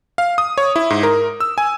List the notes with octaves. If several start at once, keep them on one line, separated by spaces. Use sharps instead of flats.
F5
D#6
C#5
E4
G#2
A#4
E6
G#5